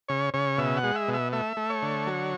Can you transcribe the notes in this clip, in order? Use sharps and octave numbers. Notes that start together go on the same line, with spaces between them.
C#3 C#5
C#3 C#5
B2 E5
F#5
G#3
E5
B2
E5
A3 E5
A3
C#5
D3
F#3